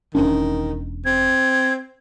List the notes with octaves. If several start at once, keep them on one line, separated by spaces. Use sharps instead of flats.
E1 D#3 C#4 D4
C4 G#6